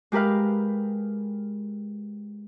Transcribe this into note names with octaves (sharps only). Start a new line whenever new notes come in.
G#3 G4 A#4 B4 F5